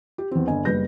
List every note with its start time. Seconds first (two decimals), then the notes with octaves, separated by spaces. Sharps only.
0.18 G4
0.31 E2 C4
0.47 G1 D#5 G#5
0.65 F#1 G3 B4 G6 A#6